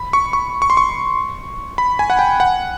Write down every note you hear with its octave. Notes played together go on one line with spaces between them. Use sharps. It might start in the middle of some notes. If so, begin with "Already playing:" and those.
Already playing: B5
C#6
C#6
C#6
C6
C#6
B5
G#5
F#5
G5
F#5